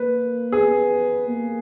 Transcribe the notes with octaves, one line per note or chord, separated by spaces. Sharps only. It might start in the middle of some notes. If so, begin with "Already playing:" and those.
Already playing: A#3 B4
B3 G#4
A#3